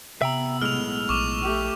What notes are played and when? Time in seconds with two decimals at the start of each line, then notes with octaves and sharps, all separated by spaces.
0.21 C3 B3 E5 G5 A#5 E6
0.61 B1 A2 G#3 F6 F7
1.09 A#1 C#6 D6 F7
1.43 A3 G4